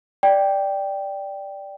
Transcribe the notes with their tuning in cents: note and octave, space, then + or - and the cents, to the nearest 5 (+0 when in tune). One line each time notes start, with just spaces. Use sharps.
D5 +0 G5 +0